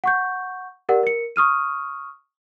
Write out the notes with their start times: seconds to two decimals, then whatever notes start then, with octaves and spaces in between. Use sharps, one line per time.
0.04 F#5 C#6 G6
0.89 G4 A#4 D5 F#5
1.03 A#4 C#7
1.36 C#6 D#6 F6 D#7